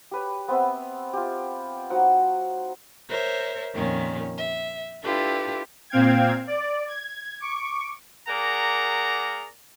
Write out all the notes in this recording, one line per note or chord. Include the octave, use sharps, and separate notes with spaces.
G4 B4 C#5
B3 C4 C5 E5
F4 G4
F#3 D#4 C5 F#5
A#4 C5 C#5 E5
F2 A#2 D#3 C#4
E5
D4 E4 F4 G4 A4 B4
A#2 C4 F5 G5 G#6
D5
G#6
C#6 D6
A#3 G#4 A#4 D5 F#5 A#5